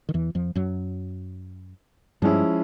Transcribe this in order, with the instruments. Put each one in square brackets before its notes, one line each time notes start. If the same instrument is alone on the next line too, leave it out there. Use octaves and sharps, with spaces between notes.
[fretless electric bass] D#3
E2 E3
F2 F3
F#2 F#3
[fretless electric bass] G2 G3 [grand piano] F3 G#3 C#4 E4